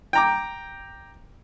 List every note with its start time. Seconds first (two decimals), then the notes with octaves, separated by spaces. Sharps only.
0.13 G5 A#5 D6